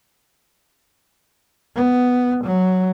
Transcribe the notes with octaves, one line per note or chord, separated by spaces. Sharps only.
B3
F#3